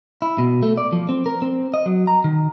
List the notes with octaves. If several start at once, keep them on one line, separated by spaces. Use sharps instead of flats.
E4
B2
A3
D5
F3
C4
A#4
C4
D#5
F#3
A#5
D#3